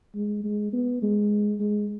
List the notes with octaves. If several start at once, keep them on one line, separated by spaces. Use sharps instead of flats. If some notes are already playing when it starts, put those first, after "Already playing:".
G#3
G#3
B3
G#3
G#3